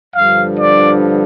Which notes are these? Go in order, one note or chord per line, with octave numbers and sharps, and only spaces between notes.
G2 D3 F3 F5
D5